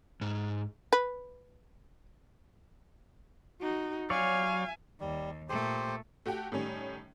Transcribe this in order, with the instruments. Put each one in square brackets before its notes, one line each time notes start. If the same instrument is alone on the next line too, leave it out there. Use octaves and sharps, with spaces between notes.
[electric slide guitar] G#2
[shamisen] B4
[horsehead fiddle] D#4 F#4
[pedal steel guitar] F#3 C#5 D5 [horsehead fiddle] F5 G#5
[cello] D#2 [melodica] G3
[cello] A#2 A3 [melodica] G4 C5
[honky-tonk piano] A3 F#4 G4 G5
A2 D#3 G3 C#4